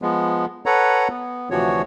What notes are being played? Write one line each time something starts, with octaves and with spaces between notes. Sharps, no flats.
F3 G#3 B3
A4 B4 C#5 F#5 A#5
B3
D2 C3 E3 F3 F#4 C#5